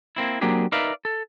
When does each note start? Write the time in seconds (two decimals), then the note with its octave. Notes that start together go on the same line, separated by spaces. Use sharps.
0.16 A#3 C4 E4
0.41 F#3 A#3 C4 D4 G4 G#4
0.72 D#4 A#4 B4 D5 E5 F5
1.05 A4